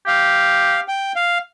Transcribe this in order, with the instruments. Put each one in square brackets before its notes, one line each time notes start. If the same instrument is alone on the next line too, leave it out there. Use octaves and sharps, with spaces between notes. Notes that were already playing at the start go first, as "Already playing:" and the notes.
[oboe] G4 [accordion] F5
[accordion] G5
F5